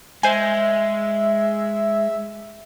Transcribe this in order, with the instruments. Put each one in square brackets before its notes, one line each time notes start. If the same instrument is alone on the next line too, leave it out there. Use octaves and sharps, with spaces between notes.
[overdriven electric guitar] G#3 [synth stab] C5 G#5 [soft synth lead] E5